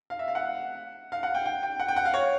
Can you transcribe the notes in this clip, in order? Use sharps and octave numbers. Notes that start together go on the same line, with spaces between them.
F5
E5
F5
F#5
F5
F#5
G5
G5
G5
F#5
G5
F#5
F5
C#5